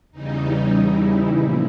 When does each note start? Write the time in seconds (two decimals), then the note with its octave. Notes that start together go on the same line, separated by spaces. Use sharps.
0.12 E2 C#3 E3 G3 D#4
0.75 E4
1.37 A#2 F3